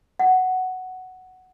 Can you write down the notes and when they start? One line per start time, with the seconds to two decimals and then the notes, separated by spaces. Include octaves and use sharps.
0.19 F#5